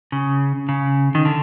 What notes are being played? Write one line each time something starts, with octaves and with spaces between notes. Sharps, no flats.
C#3
C#3
D#3
D3